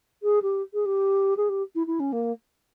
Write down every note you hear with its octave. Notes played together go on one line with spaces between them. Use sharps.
G#4
G4
G#4
G4
G#4
G4
E4
E4
C#4
A#3